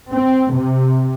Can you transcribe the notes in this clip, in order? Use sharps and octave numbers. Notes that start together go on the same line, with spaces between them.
C4
C3